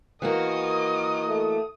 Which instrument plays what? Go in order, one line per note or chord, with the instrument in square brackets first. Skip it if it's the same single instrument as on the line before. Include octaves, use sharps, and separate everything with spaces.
[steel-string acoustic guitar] E3 A#3 F#4 [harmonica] A#4 D#5 [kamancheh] D#6
[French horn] A3